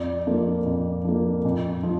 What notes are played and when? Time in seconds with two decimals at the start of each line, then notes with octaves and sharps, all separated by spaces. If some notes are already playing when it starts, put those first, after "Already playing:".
Already playing: F2 D5
0.27 F3 A#3
0.66 F2
1.04 F3 A#3
1.45 F2
1.83 F3